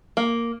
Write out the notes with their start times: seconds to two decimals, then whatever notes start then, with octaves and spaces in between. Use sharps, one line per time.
0.17 A#3